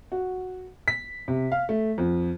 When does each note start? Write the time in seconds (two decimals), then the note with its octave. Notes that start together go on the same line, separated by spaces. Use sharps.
0.12 F#4
0.88 B6
1.28 C3
1.52 F5
1.69 A3
1.98 F2